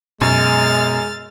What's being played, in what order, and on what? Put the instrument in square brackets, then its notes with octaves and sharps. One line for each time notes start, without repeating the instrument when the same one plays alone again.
[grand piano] F#2 [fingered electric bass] B2 [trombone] G#3 [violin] F6 A6